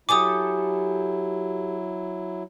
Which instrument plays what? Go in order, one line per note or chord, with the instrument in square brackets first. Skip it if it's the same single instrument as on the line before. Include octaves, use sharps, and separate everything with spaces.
[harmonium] F#3 E4 [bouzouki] G4 A4 G#5 [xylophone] D6 D#6